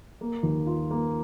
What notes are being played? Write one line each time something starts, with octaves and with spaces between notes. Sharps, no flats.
A#3
D#2
F4
A#3